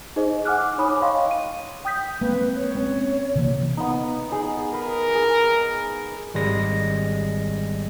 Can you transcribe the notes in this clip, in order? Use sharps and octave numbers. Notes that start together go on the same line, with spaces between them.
D#4 G#4 C5 D#5
F#5 G#5 D6 F6 F#6
D#4 C#5 G#5 B5 D6 D#6
C#5 D#5 F5 G5 C6 C#6
D#7
G5 D#6 G6 B6
G#3 A#3 C4 B4
C#5
C4 C#4
C3 E3 A#3
B3 D#4
D#4 G#4
A#4 B4
G#4
G#1 G3 G#3 A#6